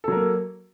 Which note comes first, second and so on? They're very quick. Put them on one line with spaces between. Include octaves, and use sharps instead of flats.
A4 F#3 A#4 A#3